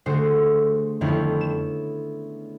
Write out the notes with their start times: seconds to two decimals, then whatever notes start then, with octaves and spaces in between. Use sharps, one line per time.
0.06 D3 G#3 A3 F#4 C5
1.01 F2 D3 D#3 B3 C#4 E4
1.41 E7